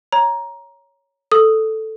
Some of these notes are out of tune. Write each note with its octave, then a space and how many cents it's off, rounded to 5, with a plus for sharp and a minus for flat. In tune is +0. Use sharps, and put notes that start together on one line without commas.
C#5 +0 A#5 +15
A4 +0 D#6 +0